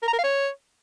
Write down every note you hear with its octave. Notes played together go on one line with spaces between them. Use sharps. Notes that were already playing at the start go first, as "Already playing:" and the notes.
A#4
A#5
A#4
F5
C#5